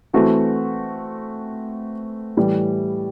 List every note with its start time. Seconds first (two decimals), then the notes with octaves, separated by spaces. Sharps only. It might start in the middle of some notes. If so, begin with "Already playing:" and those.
0.13 E3 A3 C4 F#4
2.37 A2 E3 G3